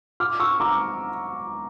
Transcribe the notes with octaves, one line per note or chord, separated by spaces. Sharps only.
D6 F6
C#6 E6
A#5 D6